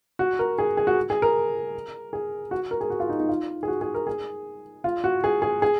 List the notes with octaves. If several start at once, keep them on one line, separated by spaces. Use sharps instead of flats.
F#4
A#4
G#4
G#4
F#4
G#4
A#4
G#4
F#4
A#4
G#4
F#4
F4
D#4
D#4
F4
G#4
F#4
G#4
A#4
G#4
F4
F#4
G#4
G#4
G#4